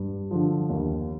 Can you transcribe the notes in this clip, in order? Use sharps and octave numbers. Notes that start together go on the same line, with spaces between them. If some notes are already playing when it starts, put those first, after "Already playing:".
Already playing: G2
D3 F3
D#2